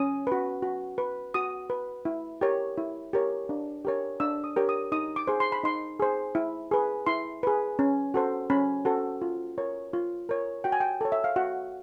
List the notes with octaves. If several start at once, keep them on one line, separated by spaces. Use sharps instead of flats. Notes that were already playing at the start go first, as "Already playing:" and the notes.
Already playing: C#4 D#6
F#4 B4
F#4
B4
F#4 D#6
B4
E4
G4 A#4 C#5
E4
G4 A#4 C#5
D4
G4 A#4 C#5
D4 E6
D#6
G4 A#4 C#5
D#6
D#4 D#6
D6
G#4 C5
C6
B5
D#4 C6
G#4 C5
E4
G#4 B4
E4 C6
G#4 B4
C#4
F#4 A4 C5
C#4 B5
F#4 A4 C5
F4
A#4 C#5
F4
A#4 C#5
F#4 G5
G#5
G5
A4 C#5
E5
F5
F#4 F#5